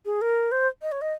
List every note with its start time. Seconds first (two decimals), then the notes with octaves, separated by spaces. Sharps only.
0.06 G#4
0.22 A#4
0.52 C5
0.82 D#5
0.92 C#5
1.02 D#5